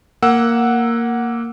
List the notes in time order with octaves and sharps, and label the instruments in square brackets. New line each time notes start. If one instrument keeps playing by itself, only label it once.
[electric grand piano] A#3 F#5 E6